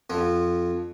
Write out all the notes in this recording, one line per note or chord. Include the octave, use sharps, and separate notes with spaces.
F2 F3